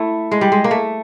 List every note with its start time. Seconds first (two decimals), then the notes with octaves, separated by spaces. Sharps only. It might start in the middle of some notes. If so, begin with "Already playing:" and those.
Already playing: A3 E4
0.31 G#3
0.41 G3
0.52 G#3
0.64 A#3
0.71 A3